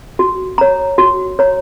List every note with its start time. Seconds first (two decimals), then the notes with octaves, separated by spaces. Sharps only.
0.19 F#4
0.58 C#5 A#5
0.98 F#4
1.39 C#5 A#5